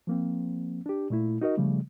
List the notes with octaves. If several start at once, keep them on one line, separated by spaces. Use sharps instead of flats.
F3 A#3 C4
D4 G4
A#2 A3 E4
D#4 F#4 A#4 D#5
C#3 F3 G3 A3